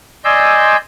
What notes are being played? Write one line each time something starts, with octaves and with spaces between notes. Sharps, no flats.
D5 D#5 G#5 C6 E6 G6